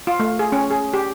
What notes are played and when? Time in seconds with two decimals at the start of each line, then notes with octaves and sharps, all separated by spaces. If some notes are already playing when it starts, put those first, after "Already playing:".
0.07 F4
0.19 A3
0.39 G#4
0.52 C#4
0.71 G#4
0.94 G4